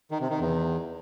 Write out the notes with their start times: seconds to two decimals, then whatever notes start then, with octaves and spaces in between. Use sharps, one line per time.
0.11 D#3
0.21 C3
0.30 D#3
0.40 E2